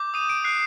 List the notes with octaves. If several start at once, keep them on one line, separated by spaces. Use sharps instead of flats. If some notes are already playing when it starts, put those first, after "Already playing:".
Already playing: D6 G6
D#6 D#7
D7
F#6 C7